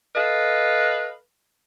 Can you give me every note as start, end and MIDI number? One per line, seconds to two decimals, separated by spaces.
0.15 1.15 69
0.15 1.15 71
0.15 1.15 75
0.15 1.15 77